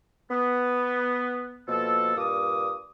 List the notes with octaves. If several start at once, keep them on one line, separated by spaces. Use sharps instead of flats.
B3
B2 F3 A#3 A4
G2 A#2 F5 D6 D#6